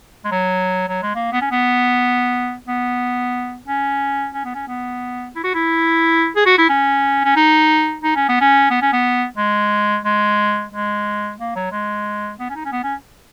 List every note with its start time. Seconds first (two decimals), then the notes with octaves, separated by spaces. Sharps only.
0.24 G#3
0.32 F#3
0.88 F#3
1.03 G#3
1.15 A#3
1.32 B3
1.42 C#4
1.51 B3
2.67 B3
3.67 C#4
4.34 C#4
4.45 B3
4.55 C#4
4.68 B3
5.35 E4
5.44 F#4
5.54 E4
6.36 G#4
6.46 F#4
6.58 E4
6.69 C#4
7.25 C#4
7.36 D#4
8.03 D#4
8.16 C#4
8.29 B3
8.41 C#4
8.71 B3
8.82 C#4
8.93 B3
9.37 G#3
10.05 G#3
10.72 G#3
11.39 A#3
11.56 F#3
11.71 G#3
12.39 B3
12.50 C#4
12.55 D#4
12.65 C#4
12.72 B3
12.84 C#4